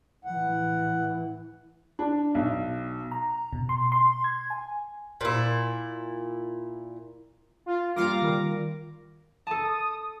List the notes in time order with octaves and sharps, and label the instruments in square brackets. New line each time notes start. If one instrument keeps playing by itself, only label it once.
[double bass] A2 E3 [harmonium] F#5
[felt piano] D4
B1
[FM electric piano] A#5
B2
C6
C6
G#6
G#5
[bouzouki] A#2 E4
[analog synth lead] F4
[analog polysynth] G3 F5 A#6 [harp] A#3 F4 C#7 [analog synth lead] D6
[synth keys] D#3 A#4
[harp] A4 A5 [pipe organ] D#6